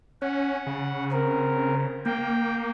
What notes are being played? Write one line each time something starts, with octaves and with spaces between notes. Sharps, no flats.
C#4 F#5
C#3
C4 A#4
A#3 G5